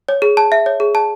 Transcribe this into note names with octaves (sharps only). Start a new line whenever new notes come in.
C#5
G#4
A5
E5
C#5
G#4
A5